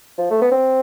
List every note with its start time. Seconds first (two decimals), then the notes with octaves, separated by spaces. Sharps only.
0.18 F3
0.30 A3
0.41 B3
0.52 C4